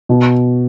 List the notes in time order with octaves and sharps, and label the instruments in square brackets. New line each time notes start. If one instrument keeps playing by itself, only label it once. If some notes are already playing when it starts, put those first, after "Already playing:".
[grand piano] B2